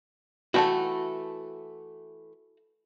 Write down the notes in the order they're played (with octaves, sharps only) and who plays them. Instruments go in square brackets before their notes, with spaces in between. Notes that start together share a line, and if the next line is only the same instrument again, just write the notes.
[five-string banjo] E3 A3 A4 [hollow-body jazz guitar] F#4 G5